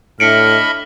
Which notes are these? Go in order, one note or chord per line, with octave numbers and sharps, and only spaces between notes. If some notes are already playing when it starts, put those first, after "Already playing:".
A2 D4 D#5 E5 B5 F6 C#7 D7